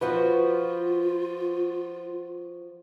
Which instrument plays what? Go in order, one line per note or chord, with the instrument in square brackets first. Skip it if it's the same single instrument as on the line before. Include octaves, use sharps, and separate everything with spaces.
[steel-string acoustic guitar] F3 F#4 B4 [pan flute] F4